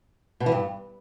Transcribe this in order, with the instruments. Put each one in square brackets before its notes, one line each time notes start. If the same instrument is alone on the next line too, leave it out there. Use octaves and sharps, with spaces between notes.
[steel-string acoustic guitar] B2
E3
G2